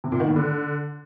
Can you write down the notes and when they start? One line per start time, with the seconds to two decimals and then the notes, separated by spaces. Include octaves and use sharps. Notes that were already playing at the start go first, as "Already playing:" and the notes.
0.04 C3
0.12 A#2
0.20 D#3
0.28 A2
0.36 D3